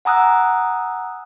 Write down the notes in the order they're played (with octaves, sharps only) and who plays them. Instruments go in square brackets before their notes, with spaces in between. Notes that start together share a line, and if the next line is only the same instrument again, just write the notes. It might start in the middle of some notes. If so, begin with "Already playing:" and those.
[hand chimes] F#5 G#5 A#5 D#6 E6 F#6